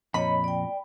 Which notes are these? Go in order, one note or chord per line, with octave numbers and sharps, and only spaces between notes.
F2 A#2 C#5 D#5 B5
D5 G5